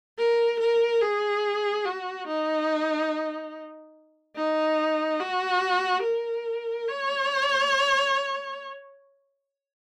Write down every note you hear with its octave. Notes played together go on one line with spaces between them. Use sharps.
A#4
A#4
G#4
F#4
D#4
D#4
F#4
A#4
C#5